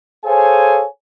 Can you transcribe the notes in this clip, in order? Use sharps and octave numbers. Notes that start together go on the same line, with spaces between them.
G#4 A4 C5 C#5 F5 G#5